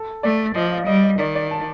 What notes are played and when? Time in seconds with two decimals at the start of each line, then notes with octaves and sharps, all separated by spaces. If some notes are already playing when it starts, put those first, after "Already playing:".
Already playing: A4
0.23 A3 D5
0.55 F3 D#5
0.71 F5
0.87 G3 D#5
1.04 D#5
1.19 D#3 D5
1.35 D5
1.51 A5